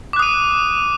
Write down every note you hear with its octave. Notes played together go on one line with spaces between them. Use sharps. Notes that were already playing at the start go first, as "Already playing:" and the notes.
D6 D#6 F#6 D#7